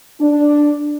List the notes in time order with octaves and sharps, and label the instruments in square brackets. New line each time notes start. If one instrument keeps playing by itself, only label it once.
[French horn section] D4